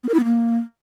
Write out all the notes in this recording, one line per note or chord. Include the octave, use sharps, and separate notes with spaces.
B3
A#4
E4
B3
A#3